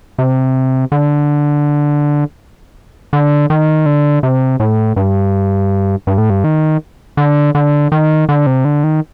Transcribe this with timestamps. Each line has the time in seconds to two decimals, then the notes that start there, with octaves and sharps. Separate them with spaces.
0.18 C3
0.92 D3
3.13 D3
3.50 D#3
3.86 D3
4.23 C3
4.60 A2
4.96 G2
6.07 G2
6.18 A2
6.30 G2
6.44 D#3
7.17 D3
7.55 D3
7.92 D#3
8.29 D3
8.47 C3
8.65 D3
8.84 D#3